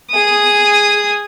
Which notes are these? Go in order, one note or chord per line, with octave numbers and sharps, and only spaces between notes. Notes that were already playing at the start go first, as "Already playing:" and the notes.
G#4 D#6